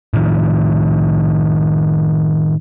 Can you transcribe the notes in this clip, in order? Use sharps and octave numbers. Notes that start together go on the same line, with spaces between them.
A2 D#3 F3